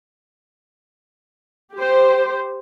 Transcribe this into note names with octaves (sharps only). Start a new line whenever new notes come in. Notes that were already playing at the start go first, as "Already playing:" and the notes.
G4 C5